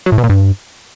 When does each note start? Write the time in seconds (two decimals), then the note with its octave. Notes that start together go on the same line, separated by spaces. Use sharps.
0.06 F#3
0.12 A2
0.18 B2
0.24 A#2
0.30 G2